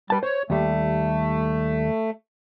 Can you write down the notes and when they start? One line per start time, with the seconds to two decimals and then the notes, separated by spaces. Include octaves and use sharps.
0.10 G3 B4 A5
0.23 C5 C#5
0.50 D#2 G3 A3